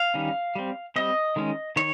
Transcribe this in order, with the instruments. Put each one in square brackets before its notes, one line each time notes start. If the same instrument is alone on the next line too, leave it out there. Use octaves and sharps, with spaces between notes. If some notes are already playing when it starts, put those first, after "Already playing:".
Already playing: [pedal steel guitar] F5
D#3 G3 C#4
G3 C4
G3 C4 D#5
D#3 G#3 C#4
D#3 C#5